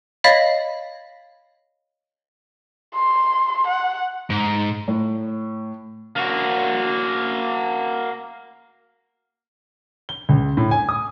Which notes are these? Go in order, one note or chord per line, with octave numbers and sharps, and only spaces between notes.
C#5 D#5 F5 B5 A6 B6
C6
F#5
G#2
A2
A#3 F#4
G7
C#2
A2
G#5
D#6